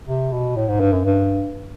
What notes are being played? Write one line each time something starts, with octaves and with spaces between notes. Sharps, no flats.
C3
B2
A2
G#2
G2
F#2
G2